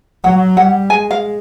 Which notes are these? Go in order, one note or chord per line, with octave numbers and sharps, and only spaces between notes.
F#3 F#5
G3 F#5
G#3 G#5
F5